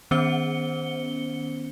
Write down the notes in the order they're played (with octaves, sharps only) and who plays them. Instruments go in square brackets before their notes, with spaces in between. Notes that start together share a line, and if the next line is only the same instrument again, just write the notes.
[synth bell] D#3 B3 C#4 C5 C#7 G7